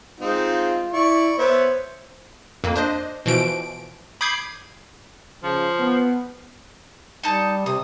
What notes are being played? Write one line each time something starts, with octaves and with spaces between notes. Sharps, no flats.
G#3 C4 D#4 F4
E4 D5 C#6
B3 C5 C#5 E5
F2 A#3
D4 C5 D#5
B2 E3 F3 D7
B5 D6 D#6 G6 G#6 C7
C#3 F3
B3
G3 D#4 A5 G6
C3 D#6